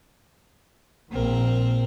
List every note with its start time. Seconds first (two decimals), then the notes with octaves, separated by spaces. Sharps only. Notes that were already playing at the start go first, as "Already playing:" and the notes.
1.12 A#1 A#2 C4 A#4